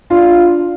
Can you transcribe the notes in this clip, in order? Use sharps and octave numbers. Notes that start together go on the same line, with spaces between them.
D4 F4